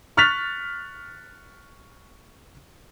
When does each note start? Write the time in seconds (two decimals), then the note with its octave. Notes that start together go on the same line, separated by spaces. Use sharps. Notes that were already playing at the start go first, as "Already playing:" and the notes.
0.17 C#6 F6 F#6 A6 B6 F7